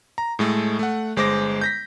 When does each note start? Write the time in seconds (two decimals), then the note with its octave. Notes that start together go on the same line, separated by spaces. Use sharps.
0.18 A#5
0.39 A2 G#3 A3
0.79 A3 F#5
1.16 G1 G#3 C5 D6 A#6
1.61 G6 A#6 B6